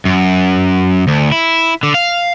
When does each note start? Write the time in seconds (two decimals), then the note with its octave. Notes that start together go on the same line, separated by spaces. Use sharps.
0.05 F#2
1.08 D2
1.32 E4
1.83 D3
1.94 F5